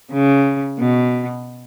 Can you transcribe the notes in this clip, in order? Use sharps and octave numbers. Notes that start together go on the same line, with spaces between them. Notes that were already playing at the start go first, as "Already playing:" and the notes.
C#3
B2